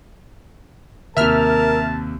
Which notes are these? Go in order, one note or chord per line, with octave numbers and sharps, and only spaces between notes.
D#2 C3 A#4 E5 A5 F6